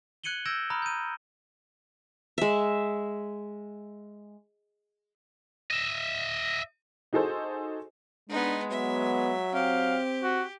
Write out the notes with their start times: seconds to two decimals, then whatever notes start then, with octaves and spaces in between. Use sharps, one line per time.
0.24 F#6 G#6 C#7 D#7 F#7 G7
0.45 E6 G6 G#6 A#6 D7 E7
0.70 A#5 B5 D#6 F6
0.82 G6 D#7
2.38 G#3 E5
5.71 D#5 E5
7.13 D#4 F#4 G#4 A4 C5
8.30 G#3 B3 D4 D#4
8.71 F#3 B3 E5
9.54 C4 G4 F5
10.23 F#4